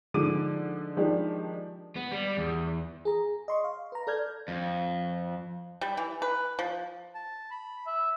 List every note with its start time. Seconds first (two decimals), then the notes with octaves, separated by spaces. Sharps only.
0.14 D3 F3 G#3 D#4 D6 D#7
0.97 D#3 F3 G#3 D4 G4
1.96 B3
2.12 G3
2.37 E2
3.05 G#4 A#5
3.48 D#5 C6 C#6
3.64 F5
3.92 B4 A#5
4.07 A4 D5 F6 G6 G#6
4.48 F2
5.81 G3
5.97 E3
6.22 B4
6.59 F3
7.15 A5
7.51 B5
7.86 E5